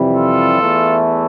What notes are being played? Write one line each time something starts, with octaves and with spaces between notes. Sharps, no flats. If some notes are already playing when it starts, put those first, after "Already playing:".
Already playing: F2 C3 E3 G3
F4 A4
E2 E3 A3